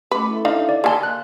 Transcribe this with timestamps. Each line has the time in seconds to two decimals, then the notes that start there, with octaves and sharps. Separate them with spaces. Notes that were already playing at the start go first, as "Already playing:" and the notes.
0.11 A3 C#4 B4 D6
0.29 E4 A4 E5
0.45 D4 D#4 F5
0.69 D5 F5
0.84 A#3 A4 G#5 A5 C6
1.03 F#6